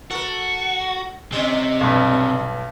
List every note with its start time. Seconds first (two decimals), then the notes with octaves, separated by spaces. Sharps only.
0.11 F#4 A4 A#4
1.32 C3 G3 C#4 D#4
1.81 B1 G2